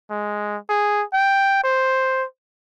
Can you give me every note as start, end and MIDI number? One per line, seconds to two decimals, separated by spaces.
0.10 0.57 56
0.69 1.03 68
1.13 1.61 79
1.64 2.25 72